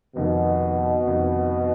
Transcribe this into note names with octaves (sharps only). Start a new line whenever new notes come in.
F1 F2 B2 D#3
F1 F2 D#3